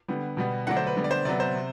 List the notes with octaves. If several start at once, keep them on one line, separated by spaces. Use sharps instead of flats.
D3 G3 B3
B2 G3 B3
D3 F#3 A3 D4 F#5
C5
B4
D3 G3 B3
D5
C5
C3 F#3 B3 D5
C5
C3